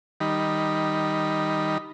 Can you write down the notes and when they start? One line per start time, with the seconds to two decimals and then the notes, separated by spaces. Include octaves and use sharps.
0.20 D#3 G3 D#4 B5